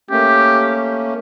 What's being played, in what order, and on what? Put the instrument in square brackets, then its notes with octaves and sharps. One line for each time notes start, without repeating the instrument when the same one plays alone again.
[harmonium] A3 A#3 C#4 [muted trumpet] G4